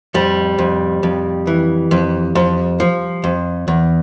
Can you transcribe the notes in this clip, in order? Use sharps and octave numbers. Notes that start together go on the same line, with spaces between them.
F2 G3
F2
F2
E3
F2
F2
F3
F2
E2